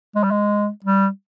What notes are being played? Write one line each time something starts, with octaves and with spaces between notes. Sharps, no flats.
G#3
G3
G#3
G3